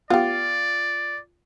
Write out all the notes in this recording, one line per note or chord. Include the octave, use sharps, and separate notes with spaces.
B3 F4 G4 D5